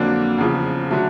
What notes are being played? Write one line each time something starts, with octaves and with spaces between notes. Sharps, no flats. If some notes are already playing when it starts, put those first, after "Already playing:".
Already playing: F2 D3 F#3 A#3 D4
E2 C#3 F3
D3 F#3 A3